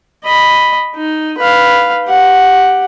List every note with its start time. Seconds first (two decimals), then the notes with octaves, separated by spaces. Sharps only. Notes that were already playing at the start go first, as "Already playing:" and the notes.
0.24 D#5 B5
0.95 D#4
1.38 B4 F5
2.05 G4 F#5